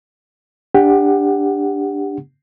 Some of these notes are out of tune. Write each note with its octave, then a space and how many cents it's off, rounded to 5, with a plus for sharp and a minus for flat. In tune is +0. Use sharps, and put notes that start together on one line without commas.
D4 +0 G4 +20 F#5 +0